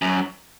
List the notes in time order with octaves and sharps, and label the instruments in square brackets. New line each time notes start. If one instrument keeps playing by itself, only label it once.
[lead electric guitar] F#2